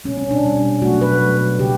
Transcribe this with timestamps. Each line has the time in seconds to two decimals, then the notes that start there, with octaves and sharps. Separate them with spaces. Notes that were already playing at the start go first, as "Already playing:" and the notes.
0.04 B2 G3 C#4
0.18 C#4
0.31 D4
0.43 B2 G3
0.82 B2 F#3 A3 F#4
1.01 B4
1.21 B2 F#3 A3
1.59 C#3 G4